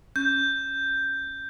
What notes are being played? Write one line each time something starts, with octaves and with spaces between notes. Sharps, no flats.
C#4 G6